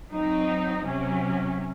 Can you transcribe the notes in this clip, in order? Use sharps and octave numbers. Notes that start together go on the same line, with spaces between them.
F#3 C4 D#4
C3 F#3 C#4